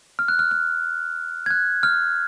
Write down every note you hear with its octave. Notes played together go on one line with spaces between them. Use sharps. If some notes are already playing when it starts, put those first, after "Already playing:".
F6
F#6
F6
F6
G#6
F#6
F6